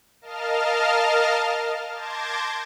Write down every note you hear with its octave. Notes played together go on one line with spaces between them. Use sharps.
A#4 D#5 F5 A5 F6
A5 C6 D6 G6 G#6 A#6